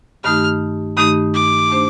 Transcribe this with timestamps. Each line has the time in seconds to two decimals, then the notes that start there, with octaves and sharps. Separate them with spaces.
0.24 G2 D#3 A3 D#4 G4 F6
0.97 G2 D#3 A3 D#4 G4 D#6
1.34 D6
1.70 A3 D4 G4 C5